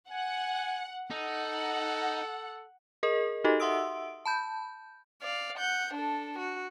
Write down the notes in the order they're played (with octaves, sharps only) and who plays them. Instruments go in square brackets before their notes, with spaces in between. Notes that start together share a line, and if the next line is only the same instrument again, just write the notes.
[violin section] F#5 [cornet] G#5
[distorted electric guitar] D#4 [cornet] A4 [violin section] F#5
[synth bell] G#4 A#4 D#5
D#4 F#4 G4 A4 D#5
E5 F#5 C6 D#6 E6 D7
A5 B5 G6
[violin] D5 F5
F#5 G6
D4 A4
F#4